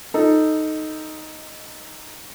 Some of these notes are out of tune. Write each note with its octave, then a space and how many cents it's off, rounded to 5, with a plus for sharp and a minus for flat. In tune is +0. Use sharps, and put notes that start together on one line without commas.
D#4 +0 A4 +0